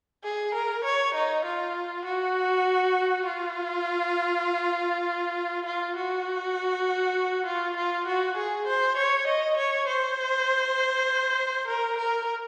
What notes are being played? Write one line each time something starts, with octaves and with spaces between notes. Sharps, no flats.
G#4
A#4
C#5
D#4
F4
F#4
F4
F4
F#4
F4
F4
F#4
G#4
C5
C#5
D#5
C#5
C5
A#4
A#4